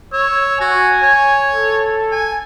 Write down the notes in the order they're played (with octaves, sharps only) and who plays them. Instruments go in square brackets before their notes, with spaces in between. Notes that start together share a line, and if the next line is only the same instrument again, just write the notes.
[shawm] C#5 [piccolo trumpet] E6
[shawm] F#4 [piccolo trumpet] G#5
[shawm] C#5
[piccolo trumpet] A4
[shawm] G#5